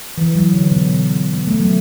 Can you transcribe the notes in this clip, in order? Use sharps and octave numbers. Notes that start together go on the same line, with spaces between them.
E3
F#3
D3
B2
D3
B3
A3
F#3